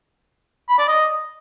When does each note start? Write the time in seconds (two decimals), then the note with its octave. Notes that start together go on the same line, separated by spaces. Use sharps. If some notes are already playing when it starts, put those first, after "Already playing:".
0.69 B5
0.79 D5
0.88 D#5